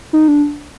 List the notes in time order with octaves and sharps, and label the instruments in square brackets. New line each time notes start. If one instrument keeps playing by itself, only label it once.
[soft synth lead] D#4
D4